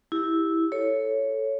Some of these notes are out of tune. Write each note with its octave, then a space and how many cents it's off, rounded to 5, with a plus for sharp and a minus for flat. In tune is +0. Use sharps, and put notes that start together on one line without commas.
E4 -10 G4 +5
A4 +0 C#5 +0